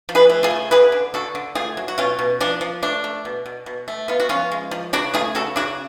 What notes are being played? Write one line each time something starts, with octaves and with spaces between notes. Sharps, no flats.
F3
G#4 B4
A3
F4 G#4
C#3
D3 G#4 B4
D3
D3 F#4 A4
D3
A3 F4 G#4
F#3
F#4
B2 C#4 F4
B2
F3 D4
F3
A3 D4
A3
B2
B2
B2
A3
B3 F4
F#4
F3 C#4 F4
G#3
F3
C#3 D4 F#4
A3 F4 G#4
C#3 F#4 A4
C#3 D4 F#4